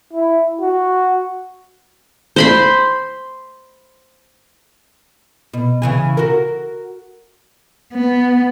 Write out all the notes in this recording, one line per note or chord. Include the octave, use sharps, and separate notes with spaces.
E4
F#4
C5 B5 C6
B2
C#3 E3 G#4
F#4 A#4
B3